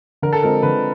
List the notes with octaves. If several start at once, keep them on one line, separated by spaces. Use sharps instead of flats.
D3 A#4
A4
F3 G#3 C4 A#4
D3 B4